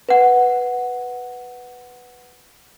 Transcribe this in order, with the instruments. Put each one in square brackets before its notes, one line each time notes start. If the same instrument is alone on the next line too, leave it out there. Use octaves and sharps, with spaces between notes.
[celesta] B4 F#5